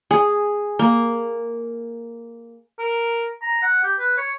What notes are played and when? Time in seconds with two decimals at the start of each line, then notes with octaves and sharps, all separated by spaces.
0.11 G#4
0.79 A#3
2.79 A#4
3.42 A#5
3.62 F#5
3.84 G4
3.99 B4
4.17 C#5